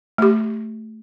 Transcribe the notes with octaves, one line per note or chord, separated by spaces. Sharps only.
A3 G4